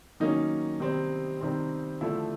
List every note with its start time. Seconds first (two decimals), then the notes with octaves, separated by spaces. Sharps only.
0.20 D#3 F#3 A#3 C#4 D#4
0.80 C3 D#3 G3 C4
1.41 C3 D#3 G3 C4
2.01 D3 F3 A3 E4